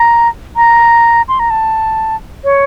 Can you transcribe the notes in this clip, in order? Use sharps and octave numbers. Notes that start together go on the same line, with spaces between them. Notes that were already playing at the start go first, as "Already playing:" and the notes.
Already playing: A#5
A#5
C6
A#5
A5
C#5